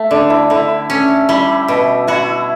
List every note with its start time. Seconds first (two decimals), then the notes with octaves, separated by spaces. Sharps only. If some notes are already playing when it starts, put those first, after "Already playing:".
Already playing: A3
0.11 D3 D4
0.30 E4
0.50 D3 E4
0.90 C#4
1.29 G3 E4
1.68 B2
2.07 E4 F#4